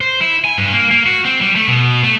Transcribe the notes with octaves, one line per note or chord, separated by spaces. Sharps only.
C5
E4
G#5
G2
A#3
A#3
F#4
C4
G3
A3
B2
A3